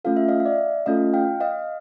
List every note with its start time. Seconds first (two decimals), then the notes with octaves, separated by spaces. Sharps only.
0.05 A3 C#4 F4 A4 F5
0.17 E5
0.28 D#5 F5
0.40 F5
0.45 D5 E5
0.86 A3 C#4 F4 A4 D#5 F5
1.14 F5 G5
1.40 D#5 F5